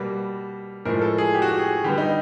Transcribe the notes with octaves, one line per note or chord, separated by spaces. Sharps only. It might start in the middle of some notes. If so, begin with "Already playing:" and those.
Already playing: B2 G3 A#3
A2 F3 G#3 A#4
A4
G#4
G4
F#4
G4
G#4
D3 G3 B3 G4
D#4